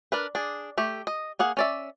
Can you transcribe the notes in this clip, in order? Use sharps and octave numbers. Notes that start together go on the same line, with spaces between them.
D4 A#4 B4
D4 G#4
A3 G4
D#5
A#3 G#4 F#5
C#4 D5 E5